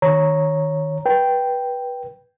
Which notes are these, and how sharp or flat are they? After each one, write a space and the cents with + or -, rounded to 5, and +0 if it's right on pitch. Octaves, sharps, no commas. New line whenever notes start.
D#3 +0 C#5 +0 A#5 +0
B4 -20 G5 +0